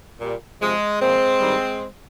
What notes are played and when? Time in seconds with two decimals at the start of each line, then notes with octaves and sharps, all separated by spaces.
0.21 A#2 G3
0.60 C3 F3 G#3
1.01 A#2 F3 G#3 C4
1.40 G2 D#3 G3